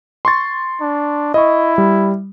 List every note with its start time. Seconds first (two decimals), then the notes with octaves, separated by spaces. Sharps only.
0.25 C6 C#6 A6
0.81 D4
1.34 E4 D#5 C#6
1.78 G3